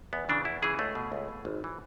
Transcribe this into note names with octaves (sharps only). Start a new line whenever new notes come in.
E2 B3
C#3 E3 D4
E2 E4
C#3 E3 G#4
C#2 A3
B2
C#2
B2
G#1
E3